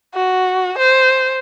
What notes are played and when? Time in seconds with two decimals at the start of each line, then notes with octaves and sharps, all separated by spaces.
0.15 F#4
0.78 C5